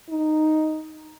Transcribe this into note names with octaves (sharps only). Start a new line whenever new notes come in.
D#4